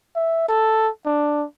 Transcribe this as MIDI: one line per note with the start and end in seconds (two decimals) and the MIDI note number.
0.16 0.46 76
0.48 0.89 69
1.06 1.45 62